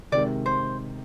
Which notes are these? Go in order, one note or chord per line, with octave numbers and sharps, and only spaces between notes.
C3 D#3 G#3 D5
C5